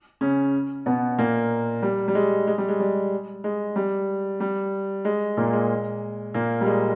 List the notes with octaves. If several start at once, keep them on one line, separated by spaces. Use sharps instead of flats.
C#3 C#4
B2 B3
A#2 A#3
G3
G3
G#3
G#3
G3
G#3
G3
G#3
G3
G3
G#3
A#2 A#3
G#3
A#2 A#3
G3
G#3